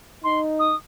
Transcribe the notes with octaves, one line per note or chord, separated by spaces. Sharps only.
D#4 C6
D#6